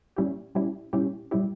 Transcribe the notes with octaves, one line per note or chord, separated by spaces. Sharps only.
A#2 G3 C#4 E4 G4
A#2 G3 C#4 E4 G4
A#2 G3 C#4 E4 G4
A#2 G3 C#4 E4 G4